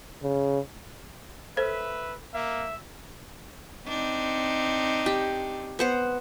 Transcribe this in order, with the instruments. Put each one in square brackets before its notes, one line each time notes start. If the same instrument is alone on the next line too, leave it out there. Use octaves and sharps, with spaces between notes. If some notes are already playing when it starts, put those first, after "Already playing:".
[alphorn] C#3
[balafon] A4 C5 [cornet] B4 [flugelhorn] E5
[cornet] A#3 [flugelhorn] E5
[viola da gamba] C4 D4 D#4
[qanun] G4
B3 C5 F#5